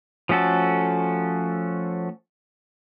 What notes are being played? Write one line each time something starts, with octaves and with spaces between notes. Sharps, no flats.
F3 A3 C#4 F#4 A4